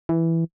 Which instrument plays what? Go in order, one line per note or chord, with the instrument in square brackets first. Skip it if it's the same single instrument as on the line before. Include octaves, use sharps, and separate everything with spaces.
[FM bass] E3